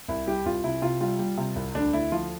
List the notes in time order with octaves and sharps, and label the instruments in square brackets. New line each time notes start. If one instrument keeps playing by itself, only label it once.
[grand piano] C2 E4
G3 G4
C2 F4
C3 E4
C3 F4
G3 F4
G3
C3
C2
D2 D4
D2 E4
F3 F4